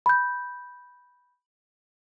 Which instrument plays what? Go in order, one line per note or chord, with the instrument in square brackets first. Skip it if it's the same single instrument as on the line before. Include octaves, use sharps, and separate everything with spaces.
[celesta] B5 G6